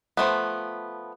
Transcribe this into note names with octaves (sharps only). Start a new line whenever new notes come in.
F3 A3 B3